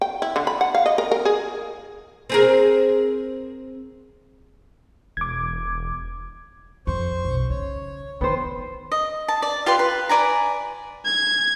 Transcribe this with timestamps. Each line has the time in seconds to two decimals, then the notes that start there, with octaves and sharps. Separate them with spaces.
0.01 G5
0.22 E4
0.36 D3
0.47 B5
0.61 F#5
0.75 F5
0.86 D#5
0.98 A#4
1.11 A#4
1.25 G#4
2.30 C4 G#4 A#4
5.17 E1 D6 G#6
6.87 F2 C5 C#6
7.25 B1
7.50 C#3 C#5
8.21 D#3 B3 C5 G5
8.92 D#5
9.28 A5
9.42 D5
9.66 F4 G4 B4 C6
9.79 B4
10.09 B4 D5 G#5 A#5
11.05 G#6